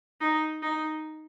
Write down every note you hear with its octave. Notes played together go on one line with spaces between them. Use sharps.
D#4
D#4